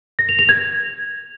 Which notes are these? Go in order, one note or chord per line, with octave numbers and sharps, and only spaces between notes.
A#6
F7
F7
G#6